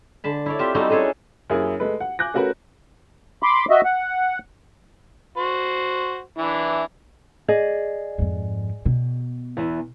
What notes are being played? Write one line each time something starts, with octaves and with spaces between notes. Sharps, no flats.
D3 A5 B5
E4 C#5 D5
C4 F4 G4 E5
G3 A3 C4 D#4 E4 F#4
A3 C#4 G#4 A4 C#5
F#2 A#3 C#4 E4 G#4 A#4
G#3 A3 B4
F#5
G#5 D6 F#6 G6 A#6
A3 C#4 F#4 A#4 B4
B5 C6 D6
F#4 D#5 E5
F#5
F#4 C5
E3 D4 E4
G#4 D5 D#5
F2 G#2
B2
E2 E3